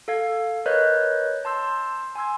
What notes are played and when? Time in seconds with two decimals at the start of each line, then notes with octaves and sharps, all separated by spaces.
0.08 A4 F5 G#6
0.66 A#4 B4 C#5 D#5 F#6 G6
1.45 A5 C6 E6 G6
2.15 G#5 C6 E6 G#6